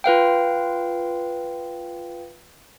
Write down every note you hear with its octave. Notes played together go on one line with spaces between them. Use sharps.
F4 B4 F5 G5